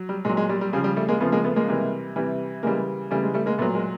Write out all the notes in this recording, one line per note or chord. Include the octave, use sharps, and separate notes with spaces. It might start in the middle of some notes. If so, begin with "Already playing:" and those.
Already playing: F#3
G3
A#2 F#3 G#3
G#3
G3
G3
C#3 F3 G3
G3
G3 A3
G#3 A#3
C#3 F3 A3 B3
G#3 A#3
A3 B3
G#3 A#3
C3 E3 G3
C3 E3 G3
C#3 E3 G3 G#3 A#3
C#3 E3 G3 A3
G#3
G3 A3
G#3 A#3
A#2 F#3 A3 B3
G#3 A#3